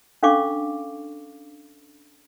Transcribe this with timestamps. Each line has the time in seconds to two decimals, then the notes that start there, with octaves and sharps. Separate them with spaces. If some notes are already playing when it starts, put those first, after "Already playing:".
0.23 C#4 D4 A4 F5 C#6 D6